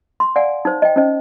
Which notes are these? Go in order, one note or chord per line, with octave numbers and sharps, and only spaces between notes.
C6
D5 F5 F#5 G#5
D#4 C5
D#5 G5
C#4 D#4 C5 D#5